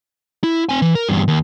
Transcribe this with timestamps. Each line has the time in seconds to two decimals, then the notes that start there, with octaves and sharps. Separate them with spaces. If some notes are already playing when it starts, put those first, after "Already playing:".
0.44 E4
0.69 C4 G#5
0.82 E3
0.95 A#4
1.09 E2 G2
1.28 D#2